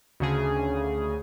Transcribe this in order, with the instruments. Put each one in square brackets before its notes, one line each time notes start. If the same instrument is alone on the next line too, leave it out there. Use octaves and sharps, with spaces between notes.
[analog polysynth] D2 C#3 G#4